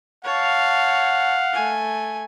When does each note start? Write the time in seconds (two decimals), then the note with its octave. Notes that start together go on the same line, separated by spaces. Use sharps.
0.24 C#5 F5 F#5 A5
1.53 A3 G#5